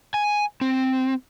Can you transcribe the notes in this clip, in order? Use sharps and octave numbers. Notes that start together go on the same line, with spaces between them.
G#5
C4